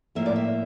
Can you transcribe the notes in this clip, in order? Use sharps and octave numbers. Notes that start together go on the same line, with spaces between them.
A2 F3 A#3 E5
D5
E5